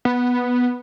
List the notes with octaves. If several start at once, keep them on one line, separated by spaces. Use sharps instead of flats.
B3